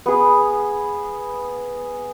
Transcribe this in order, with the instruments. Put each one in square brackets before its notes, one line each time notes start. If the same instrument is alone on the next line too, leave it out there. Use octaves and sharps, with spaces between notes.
[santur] B3 G#4